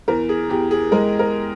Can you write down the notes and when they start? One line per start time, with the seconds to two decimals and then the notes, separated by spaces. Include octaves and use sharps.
0.08 E2 A#4
0.29 G#4
0.50 E2 G4
0.71 G#4
0.92 G#3 A#4
1.19 A#4